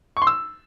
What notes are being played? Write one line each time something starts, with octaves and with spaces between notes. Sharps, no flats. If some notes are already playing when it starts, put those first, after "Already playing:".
C#6
C6
E6